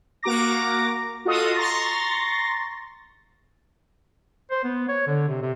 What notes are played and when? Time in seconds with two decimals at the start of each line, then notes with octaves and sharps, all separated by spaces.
0.23 A#3 F#4 A#5 D6 A#6
1.25 F4 F#4 A4 D#5 D#6
1.55 A#5 C6 C#6 A6 A#6
4.51 C5
4.64 B3
4.89 C#5
5.07 D3
5.28 C3
5.42 C3